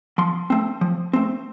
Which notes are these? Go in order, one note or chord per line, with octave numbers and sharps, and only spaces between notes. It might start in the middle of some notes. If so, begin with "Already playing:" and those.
F3 C6
A3 C4
F3
A3 C4